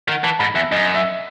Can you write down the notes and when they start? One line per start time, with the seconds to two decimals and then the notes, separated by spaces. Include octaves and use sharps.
0.08 D#3 F#5
0.24 E3 A5
0.39 G#2 B5
0.55 E2 E5
0.72 F#2 D#5
0.94 E5